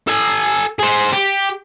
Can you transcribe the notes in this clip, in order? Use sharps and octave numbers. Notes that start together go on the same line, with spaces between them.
A4 G#5
G#4 C5
G4